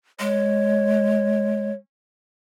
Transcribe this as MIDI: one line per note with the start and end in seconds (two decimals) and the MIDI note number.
0.19 1.71 56
0.19 1.73 73